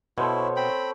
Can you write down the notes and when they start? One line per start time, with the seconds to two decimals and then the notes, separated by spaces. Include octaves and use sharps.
0.18 B2 E4 A4 C5 C#5
0.56 C4 G5 B5